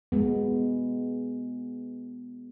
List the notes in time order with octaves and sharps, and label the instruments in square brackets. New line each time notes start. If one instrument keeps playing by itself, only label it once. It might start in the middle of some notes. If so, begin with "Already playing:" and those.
[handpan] G#3 B3